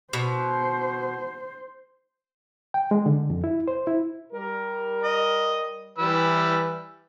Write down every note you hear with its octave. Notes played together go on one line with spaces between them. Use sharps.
B2 C5
G5
G#3
D3
F2
E4
C5
E4
G3 A#4
D#5
E3 G3 B4 E6